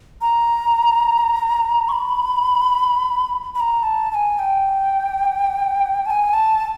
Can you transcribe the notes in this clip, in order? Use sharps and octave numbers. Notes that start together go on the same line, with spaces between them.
A#5
C#6
B5
B5
A#5
A5
A5
G#5
G5
A5
G#5
A5